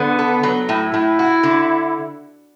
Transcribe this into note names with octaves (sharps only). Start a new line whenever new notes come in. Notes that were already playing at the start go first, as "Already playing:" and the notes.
Already playing: D3 B3
A4
F#3
A2 E4
A2
F#4
D3